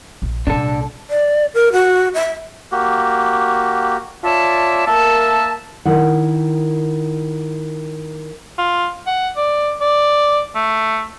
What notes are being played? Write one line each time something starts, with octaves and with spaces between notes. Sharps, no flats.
A#1
C2 A#2 D4 A4
D5
A#4
F#4
E5
A#3 F#4 G4
F4 C#5 D5 E5 A5
A#3 A#4 E5 A5
D#3 E4 F#5
F4
F#5
D5
D5
A3